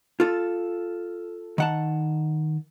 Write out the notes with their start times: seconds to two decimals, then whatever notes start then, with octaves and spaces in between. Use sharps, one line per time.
0.20 F4 A4
1.58 D#3 F#5 A5